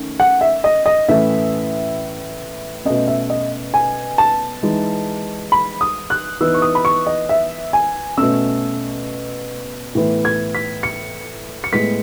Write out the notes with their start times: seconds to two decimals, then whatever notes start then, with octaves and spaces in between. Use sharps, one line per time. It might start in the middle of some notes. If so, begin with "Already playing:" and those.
Already playing: D#3 A3 C#4
0.20 F#5
0.41 E5
0.64 D#5
0.86 D#5
1.08 A2 E3 A3 C#4 E5
2.85 B2 A3 C#4 D#5
3.08 E5
3.30 D#5
3.74 G#5
4.18 A5
4.63 E3 G#3 D#4
5.52 B5
5.81 D#6
6.10 F#6
6.41 E3 B3 D#4 E6
6.54 C#6
6.62 D#6
6.75 B5
6.85 C#6
7.07 D#5
7.29 E5
7.73 G#5
8.18 B2 A3 C#4 E6
9.95 A2 E3 B3
10.25 G#6
10.55 B6
10.83 C#7
11.64 C#7
11.72 A2 G#3 B3 B6